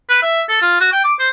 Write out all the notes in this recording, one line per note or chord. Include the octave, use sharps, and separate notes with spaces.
B4
E5
A4
F4
F#4
G5
D6
C5